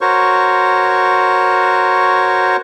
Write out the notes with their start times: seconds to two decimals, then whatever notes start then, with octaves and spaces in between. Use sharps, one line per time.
0.01 F#4 A#4 C5 C#5 C#6